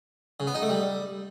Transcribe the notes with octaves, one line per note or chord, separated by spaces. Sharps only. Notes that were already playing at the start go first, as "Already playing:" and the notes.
C#3
B3
D#4
A3
G3